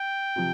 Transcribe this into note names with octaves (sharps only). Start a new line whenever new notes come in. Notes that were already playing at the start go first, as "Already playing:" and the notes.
Already playing: G5
C3 F3